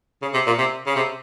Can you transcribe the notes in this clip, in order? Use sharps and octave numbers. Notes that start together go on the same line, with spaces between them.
C#3
C3
A#2
C3
C#3
C3